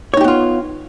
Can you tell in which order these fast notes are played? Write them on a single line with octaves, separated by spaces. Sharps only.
C#5 D#4 G4 B3 F4